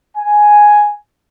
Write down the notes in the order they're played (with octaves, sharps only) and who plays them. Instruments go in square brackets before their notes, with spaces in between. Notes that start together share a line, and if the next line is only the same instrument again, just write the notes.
[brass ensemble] G#5